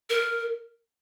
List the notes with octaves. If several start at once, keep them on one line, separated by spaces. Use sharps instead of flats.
A#4